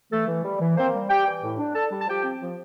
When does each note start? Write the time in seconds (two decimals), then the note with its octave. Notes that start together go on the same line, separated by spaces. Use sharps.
0.11 E3 A3 A4
0.27 E3
0.43 G3
0.61 E3
0.76 A#3 C4 C5
0.93 G3
1.09 G3 G4 G5
1.26 E3
1.42 A2
1.58 D4
1.74 D4 A4 A5
1.91 G3
2.00 A5
2.07 F3 G4 G5
2.24 C4
2.41 F3